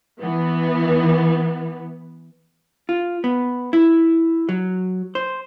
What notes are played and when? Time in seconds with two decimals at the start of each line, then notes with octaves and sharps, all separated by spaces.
0.20 E3 B3
2.89 F4
3.24 B3
3.73 E4
4.49 F#3
5.15 C5